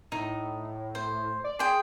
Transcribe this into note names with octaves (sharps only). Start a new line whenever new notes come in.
A2 D#4
C5
D5
G#4 G5 C6